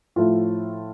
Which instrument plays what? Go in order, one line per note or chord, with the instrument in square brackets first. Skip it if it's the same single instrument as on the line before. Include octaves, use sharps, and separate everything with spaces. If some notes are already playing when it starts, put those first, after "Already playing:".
[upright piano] A2 F3 A3 F4